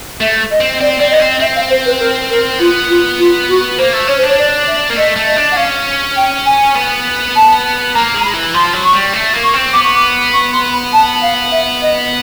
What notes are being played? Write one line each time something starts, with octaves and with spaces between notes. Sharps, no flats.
A3 E5
D#5
C4
C4 D5
C4 D5
B3 D#5
C4
C4 E5
F5
C5
B4
A#4
A#4
B3 F4
F4
F4
F#4
A#3 C5
A3
C#4 C#5
C5
D4 C#5
D5
E5
A#3
A3 D#5
A3
D#5
D4
F#5
C#4 F5
G5
G#5
B3
A5
A#3 A#5
G#3
A#5
B5
E3
F3 C6
F#3
C#6
G3
A3
A#3
C#6
C4
B3 D6
C#6
D6
C#6
C6
B5
A5
F5
E5
D#5